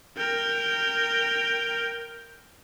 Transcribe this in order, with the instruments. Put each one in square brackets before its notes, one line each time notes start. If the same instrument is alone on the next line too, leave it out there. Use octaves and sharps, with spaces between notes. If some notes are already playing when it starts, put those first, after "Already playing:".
[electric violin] A#4 G5